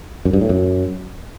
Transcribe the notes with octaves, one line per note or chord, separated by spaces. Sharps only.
F#2
G2
A2
F#2